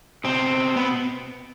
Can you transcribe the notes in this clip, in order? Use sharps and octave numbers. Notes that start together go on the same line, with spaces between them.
B2 C4
B3